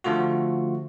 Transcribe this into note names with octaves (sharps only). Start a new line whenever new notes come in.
D3 F3 A3 F4 F#4